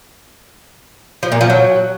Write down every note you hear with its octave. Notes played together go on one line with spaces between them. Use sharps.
F3
A#2
F3
F#3